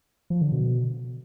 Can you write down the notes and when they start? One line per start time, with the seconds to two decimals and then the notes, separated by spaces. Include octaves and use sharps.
0.30 F3
0.41 D3
0.52 B2